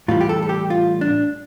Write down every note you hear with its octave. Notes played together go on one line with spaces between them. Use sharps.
A2 E3 G3 F4
G4
A4
A4
G4
F4
D4